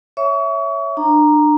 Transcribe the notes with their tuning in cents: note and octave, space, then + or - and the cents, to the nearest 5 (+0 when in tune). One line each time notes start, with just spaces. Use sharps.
C#5 +0 E5 +0 C#6 +35
D4 +30 A#5 +0